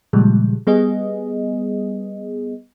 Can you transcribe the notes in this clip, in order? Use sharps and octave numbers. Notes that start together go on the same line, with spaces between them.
A#2 C#3 F3 G3 G#3
G3 B3 G#4 D#5